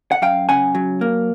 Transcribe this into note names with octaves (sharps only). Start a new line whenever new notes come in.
F#5
F#2 F5 G5
C#3 F#5 G#5
F#3
A#3